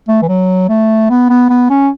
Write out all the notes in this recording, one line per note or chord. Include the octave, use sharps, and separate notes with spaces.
A3
E3
F#3
A3
B3
B3
B3
C#4